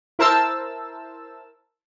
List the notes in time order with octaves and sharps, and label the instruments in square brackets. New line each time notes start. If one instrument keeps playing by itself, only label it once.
[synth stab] E4 A#4 C5 A5 E6